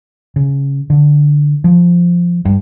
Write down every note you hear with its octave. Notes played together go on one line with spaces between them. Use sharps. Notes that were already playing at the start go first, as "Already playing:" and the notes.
C#3
D3
F3
G2